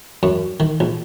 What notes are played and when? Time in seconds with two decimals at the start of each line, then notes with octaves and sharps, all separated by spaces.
0.23 F#2
0.60 D#3
0.80 A#1